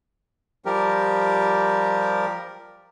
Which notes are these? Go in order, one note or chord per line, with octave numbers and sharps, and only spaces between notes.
F3 G3 G4 A#4